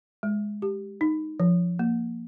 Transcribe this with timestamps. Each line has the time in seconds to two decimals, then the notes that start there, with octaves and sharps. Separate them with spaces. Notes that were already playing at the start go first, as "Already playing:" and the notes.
0.23 G#3
0.62 G4
1.01 D#4
1.40 F3
1.79 A#3